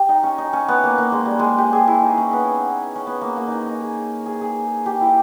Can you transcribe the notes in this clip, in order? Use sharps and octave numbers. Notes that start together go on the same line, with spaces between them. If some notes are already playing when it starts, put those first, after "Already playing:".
Already playing: G4
D#4
C#4
D#4
C#4
B3
A#3
A#3
G#3
G3
G#3
G4
G#4
E4
D#4
C#4
B3
C#4
B3
A#3
A#3
C#4 D#4
D#4
G#4
G#4
G#4
G4
E4